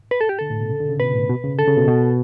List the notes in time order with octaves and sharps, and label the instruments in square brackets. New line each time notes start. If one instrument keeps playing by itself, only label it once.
[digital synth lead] B4
A4
G4
[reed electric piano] D3 [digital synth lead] A4
[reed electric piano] A2
B2
C#3
D3
C#3
[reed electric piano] B2 [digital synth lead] B4
[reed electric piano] A2
B2
C#3
[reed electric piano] D3 [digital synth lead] A4
[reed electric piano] C#3
B2
B2